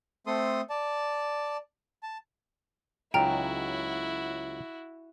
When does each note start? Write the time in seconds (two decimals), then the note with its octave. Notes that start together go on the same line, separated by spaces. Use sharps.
0.27 A3 C4 A4 C6 D#6
0.70 D5 A5
2.03 A5
3.14 C#2 F#3 D#4 E4 F#4 G5 A#5 F6